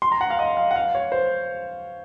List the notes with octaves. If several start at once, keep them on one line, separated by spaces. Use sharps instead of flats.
C6
A#5
F#5
F5
D#5
F5
F#5
F5
C#5
C5